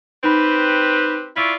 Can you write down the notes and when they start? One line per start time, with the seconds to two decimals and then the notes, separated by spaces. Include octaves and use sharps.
0.24 C4 D#4 G4 B4 B5
1.36 E4 F4 D5 C#6 E6 B6